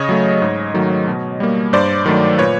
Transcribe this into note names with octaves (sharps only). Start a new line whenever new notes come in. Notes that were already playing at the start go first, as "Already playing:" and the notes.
Already playing: C#3 C#5 D#5
F#3 A3
G#2
D#3 F#3 A3
B2
G3 A#3
G2 C5 D5
D#3 F#3 A3
A#2 B4 C#5